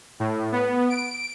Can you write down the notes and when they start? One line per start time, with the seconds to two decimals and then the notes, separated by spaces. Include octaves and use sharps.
0.20 A2
0.52 B3
0.90 D7